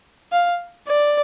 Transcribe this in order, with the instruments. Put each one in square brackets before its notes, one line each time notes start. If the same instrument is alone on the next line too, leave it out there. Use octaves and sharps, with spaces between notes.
[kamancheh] F5
D5